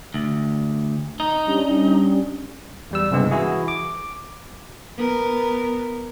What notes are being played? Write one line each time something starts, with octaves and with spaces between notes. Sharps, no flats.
D2
D#4
G3 C#4 D4
E2 G3 E6
C2 G2 C#3 G#3 B3
E3 E4 F#4 G#4
D6
B3 A#4